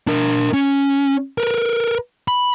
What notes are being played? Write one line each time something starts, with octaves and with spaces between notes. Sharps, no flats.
D4 A#4
C#4
A#4 B4
B5